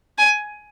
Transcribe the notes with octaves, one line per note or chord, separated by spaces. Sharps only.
G#5